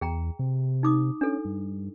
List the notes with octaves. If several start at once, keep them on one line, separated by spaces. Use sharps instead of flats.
E2 G#4 G5 A#5
C3
D#4 D6 D#6
C#4 D4 A4
G2